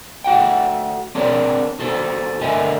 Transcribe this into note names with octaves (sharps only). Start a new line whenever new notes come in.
A3 F#4 F#5 G5
C4 D4 G#4 A#4 C#5 D5
D#4 F#4 A4 C5
A2 D3 A#4 D#5 E5 G#5